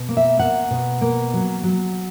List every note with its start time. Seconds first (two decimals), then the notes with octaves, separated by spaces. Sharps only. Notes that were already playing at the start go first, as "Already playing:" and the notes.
Already playing: B2
0.09 A#3
0.17 E5
0.39 A#3 F#5
0.71 B2
1.01 A#3
1.34 F#3
1.63 F#3